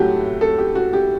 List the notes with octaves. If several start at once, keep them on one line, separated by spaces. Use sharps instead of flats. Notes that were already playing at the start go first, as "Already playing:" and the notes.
Already playing: A2 F#3 A3 F#4 G4
A4
G4
F#4
G4